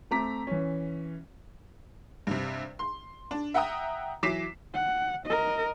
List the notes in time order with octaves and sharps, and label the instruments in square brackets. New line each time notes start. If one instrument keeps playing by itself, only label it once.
[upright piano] A3 C4 A#5 D6 B6
E3 C#4
[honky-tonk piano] G2 C3
C6
D4
E5 F#5 G5 A#5 D#6
E3 F#3 D6 B6 C7 E7
[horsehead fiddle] F#5
A#4 D#5